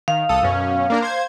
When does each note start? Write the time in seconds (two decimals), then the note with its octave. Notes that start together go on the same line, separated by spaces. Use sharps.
0.08 D#3 F5
0.29 C2 A4 D#6
0.43 F#2 B2 C#4
0.90 A#3 D4 A#4
1.02 C5 G#6